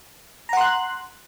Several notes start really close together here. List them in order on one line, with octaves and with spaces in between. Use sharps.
A#5 F#5 C6 F#6